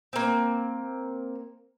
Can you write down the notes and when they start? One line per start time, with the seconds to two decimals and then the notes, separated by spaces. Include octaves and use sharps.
0.13 A#3 C4